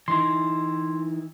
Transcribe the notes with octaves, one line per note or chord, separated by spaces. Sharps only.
E3 D#4 E4 C6